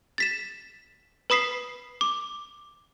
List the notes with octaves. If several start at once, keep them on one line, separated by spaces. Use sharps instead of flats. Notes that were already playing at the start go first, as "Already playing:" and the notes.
A6 B6 E7
B4 B5 D#6 B6 C7
D6